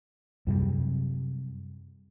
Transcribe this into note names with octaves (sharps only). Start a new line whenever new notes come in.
F#2 C3 G3